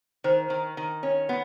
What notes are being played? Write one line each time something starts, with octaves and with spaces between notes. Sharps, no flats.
D#3 C5
D#3
D#3
C#4
B3